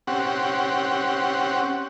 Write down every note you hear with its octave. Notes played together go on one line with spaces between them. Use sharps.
C4 C#4 G4 F#5